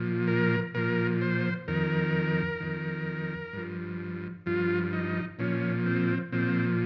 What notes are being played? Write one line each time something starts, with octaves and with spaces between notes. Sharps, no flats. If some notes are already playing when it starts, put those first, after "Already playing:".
Already playing: A#2 F3
A#4
A#2 F3 A#4
C5
F2 D#3 A#4
F2 D#3
G2 F3
G2 F3 F4
D#4
A#2 F3 C#4
C4
A#2 F3 C4